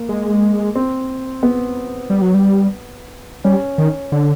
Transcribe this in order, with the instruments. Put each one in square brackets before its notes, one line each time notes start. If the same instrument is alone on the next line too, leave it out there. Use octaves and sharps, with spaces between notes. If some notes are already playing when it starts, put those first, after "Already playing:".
Already playing: [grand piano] A#3
[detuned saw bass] G#3
[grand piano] C4
B3
[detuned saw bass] G3
F#3
G3
[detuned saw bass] G3 [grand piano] C#4
[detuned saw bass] D#3
D3